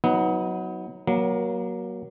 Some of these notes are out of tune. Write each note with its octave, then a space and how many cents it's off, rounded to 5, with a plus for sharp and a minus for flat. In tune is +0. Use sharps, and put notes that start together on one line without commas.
F#3 +0 B3 +0 D#4 +35
F#3 +15 A#3 +30